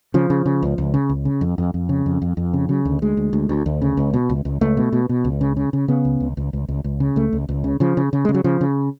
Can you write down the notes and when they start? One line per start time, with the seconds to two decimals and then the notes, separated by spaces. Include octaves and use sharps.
0.14 C#3 F3
0.30 C#3
0.46 C#3
0.63 C#2
0.78 C#2
0.94 C#3
1.09 C#2
1.25 C#3
1.41 F2
1.58 F2
1.74 F2
1.89 C#3
2.06 F2
2.22 F2
2.37 F2
2.54 C#3
2.69 C#3 F#3
2.85 D2
3.02 D2 G#3
3.17 D2
3.33 D2
3.49 D2
3.66 D2
3.82 C#3
3.97 C#2
4.14 B2
4.29 C#2
4.45 C#2
4.61 C#2 A3
4.77 B2
4.92 B2
5.09 B2
5.24 C#2
5.41 C#3
5.57 C#3
5.73 C#3
5.88 C#3 B3
6.05 C#2
6.20 C#2
6.37 C#2
6.53 C#2
6.68 C#2
6.84 C#2
7.00 C#3
7.16 C#2 A3
7.33 C#2
7.49 C#2
7.64 C#3
7.80 C#3 F3
7.97 C#3
8.13 C#3
8.25 C#3 G#3
8.34 F#3
8.44 C#3 F3
8.61 C#3